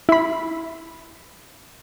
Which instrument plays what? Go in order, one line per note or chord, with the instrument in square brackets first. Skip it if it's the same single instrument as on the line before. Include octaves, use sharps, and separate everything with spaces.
[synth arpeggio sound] E4 B5